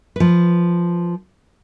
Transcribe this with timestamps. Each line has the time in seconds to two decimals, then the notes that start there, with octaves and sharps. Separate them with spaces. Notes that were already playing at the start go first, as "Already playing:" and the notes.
0.16 F3 B4